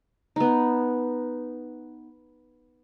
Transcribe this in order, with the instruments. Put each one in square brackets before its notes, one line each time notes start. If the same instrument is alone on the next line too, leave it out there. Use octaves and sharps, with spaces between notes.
[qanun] B3 D#4